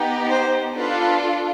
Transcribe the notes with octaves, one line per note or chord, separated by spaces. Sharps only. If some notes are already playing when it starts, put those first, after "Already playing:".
Already playing: B3 D#4 G4
C5
D4 F4 A4 B4